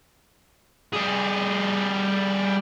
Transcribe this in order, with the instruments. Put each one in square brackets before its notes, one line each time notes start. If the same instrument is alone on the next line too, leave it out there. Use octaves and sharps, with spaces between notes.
[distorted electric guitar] G3 G#4